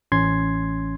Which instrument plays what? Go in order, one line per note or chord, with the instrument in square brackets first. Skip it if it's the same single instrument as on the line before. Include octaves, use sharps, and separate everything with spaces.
[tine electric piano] A1 C#4 C6 G#6 C7